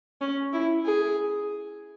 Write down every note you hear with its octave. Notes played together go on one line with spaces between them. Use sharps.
C#4
E4
G#4